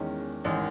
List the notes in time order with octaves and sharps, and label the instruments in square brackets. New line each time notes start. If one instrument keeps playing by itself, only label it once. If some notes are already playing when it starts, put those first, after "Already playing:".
Already playing: [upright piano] E2 D#3 G#3 C#4
A1 G#2 D#3